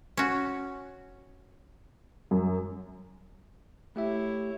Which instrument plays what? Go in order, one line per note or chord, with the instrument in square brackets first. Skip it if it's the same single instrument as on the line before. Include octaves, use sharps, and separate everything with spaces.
[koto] C#4 F#4
[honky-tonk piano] F#2
[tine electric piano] A3 G4 E5 [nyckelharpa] E4 C#5